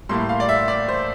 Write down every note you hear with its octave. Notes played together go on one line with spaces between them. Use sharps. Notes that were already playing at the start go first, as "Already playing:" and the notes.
A2 G3 A#3 E4 C6
F5
D5
E5
D5
C5